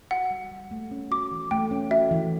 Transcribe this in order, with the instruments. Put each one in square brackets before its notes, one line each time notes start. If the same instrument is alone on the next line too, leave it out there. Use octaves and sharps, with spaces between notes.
[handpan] F#4 [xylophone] F#5
[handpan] G3
G3
A3
C#4
[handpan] F#4 [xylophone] D6
[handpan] E3
[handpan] A3 [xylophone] G5
[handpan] C#4
[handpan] F#4 [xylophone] E5
[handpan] E3